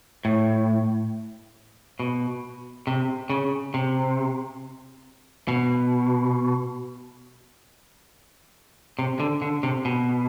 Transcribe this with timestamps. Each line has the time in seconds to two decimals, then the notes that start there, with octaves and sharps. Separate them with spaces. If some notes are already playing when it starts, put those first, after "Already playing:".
0.25 A2
2.00 B2
2.87 C3
3.30 C#3
3.74 C3
5.48 B2
8.99 C3
9.20 D3
9.42 D3
9.63 C3
9.85 B2